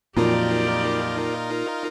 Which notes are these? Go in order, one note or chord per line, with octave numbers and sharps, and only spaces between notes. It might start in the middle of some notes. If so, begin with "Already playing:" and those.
F2 A#2 F#3 D#4 F4 G4 A#4 D5